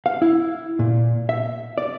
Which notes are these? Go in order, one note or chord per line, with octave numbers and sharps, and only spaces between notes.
F5
E4
A#2
E5
D5